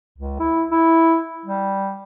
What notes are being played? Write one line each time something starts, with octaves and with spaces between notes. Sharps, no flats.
C#2
E4
E4
G3